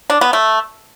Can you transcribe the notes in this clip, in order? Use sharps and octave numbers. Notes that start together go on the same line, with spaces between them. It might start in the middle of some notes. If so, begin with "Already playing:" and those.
D4
B3
A3